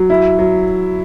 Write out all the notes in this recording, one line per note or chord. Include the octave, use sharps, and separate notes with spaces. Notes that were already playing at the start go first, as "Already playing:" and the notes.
Already playing: F#3
E4
F#3